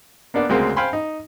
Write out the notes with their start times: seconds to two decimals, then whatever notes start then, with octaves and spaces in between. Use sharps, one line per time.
0.34 A#3 B3 D4 D5
0.49 D2 C#3 G#3 A#3 C4
0.77 C5 F5 G5 G#5 B5 C6
0.93 D#4